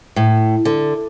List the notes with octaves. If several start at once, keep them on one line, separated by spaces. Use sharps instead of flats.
A2
D3